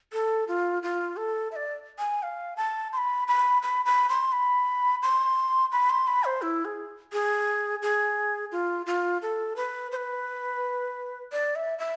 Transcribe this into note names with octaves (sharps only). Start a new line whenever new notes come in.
A4
F4
F4
A4
E5
D5
G#5
F5
A5
C6
B5
B5
B5
B5
C6
B5
C6
B5
C6
B5
C5
E4
G#4
G#4
G#4
F4
F4
A4
B4
C5
B4
D5
E5
E5